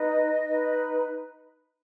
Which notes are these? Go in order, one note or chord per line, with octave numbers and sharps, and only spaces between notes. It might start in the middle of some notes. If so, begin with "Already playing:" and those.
Already playing: D#4 B4 D#5
D#4 B4